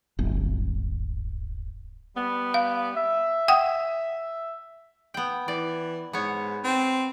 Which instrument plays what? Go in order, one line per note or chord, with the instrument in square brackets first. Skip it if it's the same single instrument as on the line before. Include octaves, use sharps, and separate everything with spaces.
[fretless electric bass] D1 G1
[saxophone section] G3 B3
[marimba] F5
[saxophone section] E5
[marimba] F#5 G5 D#6
[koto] B3 G5
[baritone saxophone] E3 [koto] D5
[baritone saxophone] G#2 [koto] B3 C#5
[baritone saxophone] C4